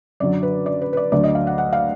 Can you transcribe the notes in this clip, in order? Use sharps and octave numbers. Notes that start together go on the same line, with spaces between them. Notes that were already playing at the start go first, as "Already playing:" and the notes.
F#2 D3 F#3 D5
B4
D5
B4
B4
D5
D2 D3 F#3 D5
D#5
F5
F#5
F#5
F5